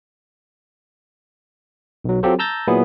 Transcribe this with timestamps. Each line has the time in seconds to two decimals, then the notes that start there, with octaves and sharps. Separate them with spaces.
2.04 B1 F#3
2.23 F#3 C4 F4 G4 A4 C5
2.39 A5 A#5 E6 G6 A6 A#6
2.67 A#2 F#3 B3 E4 G#4